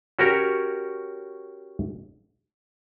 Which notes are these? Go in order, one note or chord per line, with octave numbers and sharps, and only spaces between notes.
C#4 F#4 G4 A#4 C#5